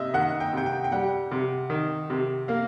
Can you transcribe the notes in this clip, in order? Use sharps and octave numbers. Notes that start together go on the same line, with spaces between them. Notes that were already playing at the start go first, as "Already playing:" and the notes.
Already playing: C3 D#5 E5
D#3 F#5
G5
C3 G5
G5
G5
G3 F#5
C3
D#3
C3
A#3 F5